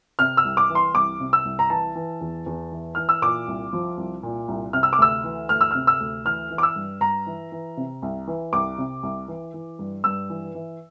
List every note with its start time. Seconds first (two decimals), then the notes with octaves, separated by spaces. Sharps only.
0.19 C3 F6
0.37 E6
0.44 C2
0.57 D6
0.69 E3
0.75 C6
0.95 C2 D6
1.20 C3
1.33 E6
1.45 C2
1.59 A#5
1.70 E3 A5
1.95 E3
2.21 E2
2.46 E2
2.72 E3
2.95 E3 F6
3.09 E6
3.22 A#2 D6
3.47 C2
3.73 F3
3.97 C2
4.23 A#2
4.48 C2
4.73 C3 F6
4.83 E6
4.93 D6
4.98 D2 E6
5.24 E3
5.49 D2 F6
5.61 E6
5.71 C3 F6
5.87 E6
6.00 D2
6.25 E3 F6
6.51 E3
6.58 D6
6.63 E6
6.76 G2
7.01 G2 A#5
7.27 E3
7.52 E3
7.77 C3
8.02 C2
8.27 E3
8.53 C2 D6
8.78 C3
9.03 C2
9.28 E3
9.54 E3
9.79 G2
10.04 G2 E6
10.30 E3
10.55 E3